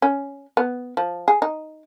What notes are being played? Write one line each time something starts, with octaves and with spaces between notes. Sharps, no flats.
C#4
B3
F3
G#4
D#4